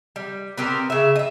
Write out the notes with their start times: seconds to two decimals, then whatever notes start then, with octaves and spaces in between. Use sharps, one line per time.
0.16 G3
0.58 B3 C4 G4 A#4
0.90 C#3 E5
1.16 D#5 E5